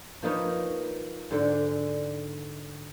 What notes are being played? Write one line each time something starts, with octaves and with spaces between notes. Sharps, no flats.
F3 A#3 D#4 B4 C#5
G#2 D3